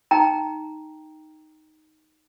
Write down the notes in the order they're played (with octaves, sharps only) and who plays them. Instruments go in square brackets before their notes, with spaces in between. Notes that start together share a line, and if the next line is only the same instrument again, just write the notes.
[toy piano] D#4 G5 A#5